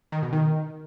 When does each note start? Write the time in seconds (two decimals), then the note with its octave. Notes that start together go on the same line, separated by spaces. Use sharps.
0.12 D#3
0.22 B2
0.33 D#3